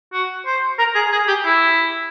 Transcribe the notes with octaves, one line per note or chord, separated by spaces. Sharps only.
F#4
C5
A#4
G#4
G#4
G4
E4